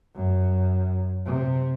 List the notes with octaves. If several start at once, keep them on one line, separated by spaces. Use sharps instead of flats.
F#2
C3